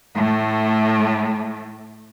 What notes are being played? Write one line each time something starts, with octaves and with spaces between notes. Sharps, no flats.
A2 A3